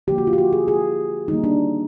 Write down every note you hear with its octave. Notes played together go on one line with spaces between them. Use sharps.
D3 F3 A#3 G4
F#4
F4
G4
F#4
G#4
G#4
D#3 G3 A#3 D#4
D4